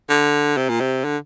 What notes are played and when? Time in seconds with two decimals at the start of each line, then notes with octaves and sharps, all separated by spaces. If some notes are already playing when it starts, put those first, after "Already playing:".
0.09 D3
0.57 C3
0.69 A#2
0.80 C3
1.04 D3